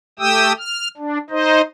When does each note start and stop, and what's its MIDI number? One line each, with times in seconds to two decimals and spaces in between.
0.19 0.52 57
0.19 0.52 67
0.19 0.52 79
0.19 0.52 87
0.19 0.52 88
0.59 0.88 89
0.97 1.18 62
1.30 1.61 63
1.30 1.61 72
1.30 1.61 75